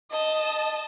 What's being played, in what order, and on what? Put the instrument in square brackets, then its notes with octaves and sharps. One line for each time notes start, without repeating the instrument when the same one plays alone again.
[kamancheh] D#5 A5